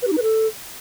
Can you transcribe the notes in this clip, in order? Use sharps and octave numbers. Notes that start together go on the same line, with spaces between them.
B4
G4
D#4
B4
A4